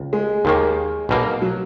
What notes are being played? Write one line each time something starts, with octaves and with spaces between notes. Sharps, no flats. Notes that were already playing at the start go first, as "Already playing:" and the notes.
Already playing: C#2
G#3
D#2 D#3 A#3
B1 B2 A#3
F#3